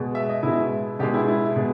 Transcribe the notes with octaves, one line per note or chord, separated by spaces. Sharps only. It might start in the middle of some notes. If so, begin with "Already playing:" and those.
Already playing: B2 G#3
E5
D#5
B2 G#3 E4
B2 G#3 G4
E4
E4
B2 G#3